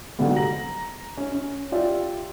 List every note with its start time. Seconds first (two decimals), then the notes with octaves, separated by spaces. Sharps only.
0.19 G#2 D3 F#3 G3 B3
0.36 A#5 A#6 F#7
1.17 C#4
1.32 C#4
1.72 F4 G4 D5 E5